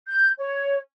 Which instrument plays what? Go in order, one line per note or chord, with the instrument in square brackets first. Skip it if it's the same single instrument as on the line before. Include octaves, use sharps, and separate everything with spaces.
[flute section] G6
C#5